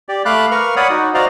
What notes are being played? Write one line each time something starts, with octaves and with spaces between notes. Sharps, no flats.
G4 D5
A3 F5 B5 D6 F#6
A#4 B4 F5 C#6 F6
C#5 D5 F#5 B5 D#6
D#4 F#4
F#4 C5 D5 D#5 F5 A#5